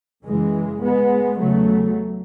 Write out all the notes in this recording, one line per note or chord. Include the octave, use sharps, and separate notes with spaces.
F#2 C#3 E3 G#3
G#3 B3
E2 C#3 F#3 A3